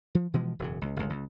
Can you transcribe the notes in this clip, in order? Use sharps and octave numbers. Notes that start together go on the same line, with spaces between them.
F3
B2 E3 F3 G#3
E1 F#2 C#3
C#2
G1 C#2
C#2